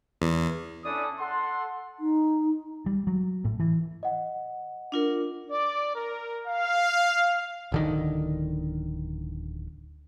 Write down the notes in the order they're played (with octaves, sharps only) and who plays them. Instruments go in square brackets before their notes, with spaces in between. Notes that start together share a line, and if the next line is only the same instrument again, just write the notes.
[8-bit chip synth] E2
[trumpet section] C#4 D4 E4 A4 D5 D#6
A4 F#5 C6
[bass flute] D#4
[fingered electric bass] G3
F#3
A2
E3
[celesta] D#5 F#5
[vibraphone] D4 F4 A#4
[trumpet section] D5
A#4
F5
[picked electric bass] D1 D3 D#3